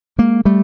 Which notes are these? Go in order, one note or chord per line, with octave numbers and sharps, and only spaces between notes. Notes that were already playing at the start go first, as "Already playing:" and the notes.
G#3 A#3
G3 A3